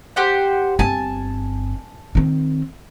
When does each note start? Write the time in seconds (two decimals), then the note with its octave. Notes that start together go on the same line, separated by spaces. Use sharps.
0.16 G4 C5 F#5
0.79 G1 C4 G#5 A5
2.15 D#3 C4